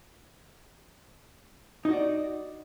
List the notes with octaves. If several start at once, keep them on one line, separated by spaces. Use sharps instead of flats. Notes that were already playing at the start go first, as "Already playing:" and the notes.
D#4 F#4 D5